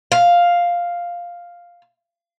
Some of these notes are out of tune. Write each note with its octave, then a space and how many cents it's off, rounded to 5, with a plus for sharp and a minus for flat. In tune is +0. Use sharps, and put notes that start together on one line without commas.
F5 +0